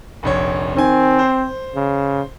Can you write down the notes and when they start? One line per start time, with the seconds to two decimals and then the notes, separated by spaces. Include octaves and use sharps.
0.23 F1 A#1 C#5
0.76 D#3 C4 G#5
1.19 C5
1.76 C#3